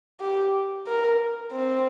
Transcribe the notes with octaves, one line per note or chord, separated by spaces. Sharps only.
G4
A#4
C4